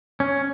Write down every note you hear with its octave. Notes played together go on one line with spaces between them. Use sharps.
C#4